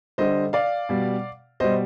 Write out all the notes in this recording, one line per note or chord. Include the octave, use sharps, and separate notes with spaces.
D3 G3 C5 D#5
D5 F5
B2 G3
B2 G3 C5 D#5